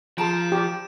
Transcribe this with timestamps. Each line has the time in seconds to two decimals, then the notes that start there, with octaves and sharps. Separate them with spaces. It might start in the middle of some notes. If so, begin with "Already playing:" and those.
0.18 F3 G#4 A5 A#5 D7 E7
0.52 G4